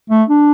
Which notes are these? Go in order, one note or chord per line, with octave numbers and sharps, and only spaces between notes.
A3
D4